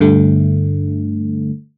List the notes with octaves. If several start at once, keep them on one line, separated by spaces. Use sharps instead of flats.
G2 D3 A3